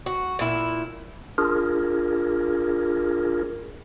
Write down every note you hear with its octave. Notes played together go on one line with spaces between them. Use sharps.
F#4
A#2 E4
D4 F4 G#4 A#4